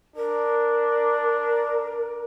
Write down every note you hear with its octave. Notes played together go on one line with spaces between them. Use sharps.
D4 A#4